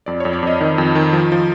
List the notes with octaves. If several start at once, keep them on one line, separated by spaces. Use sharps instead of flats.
F2 D5
F2 C#5
D5
F2 D#5
D#3 D#5
F2
D#3
F3
F3